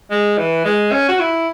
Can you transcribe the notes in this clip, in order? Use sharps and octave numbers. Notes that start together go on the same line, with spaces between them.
G#3
E3
G#3
C#4
F#4
E4